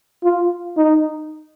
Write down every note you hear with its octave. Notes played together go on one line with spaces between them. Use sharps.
F4
D#4